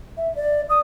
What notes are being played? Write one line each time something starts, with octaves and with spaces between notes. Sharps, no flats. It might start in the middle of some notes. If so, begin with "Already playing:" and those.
E5
D5
D#6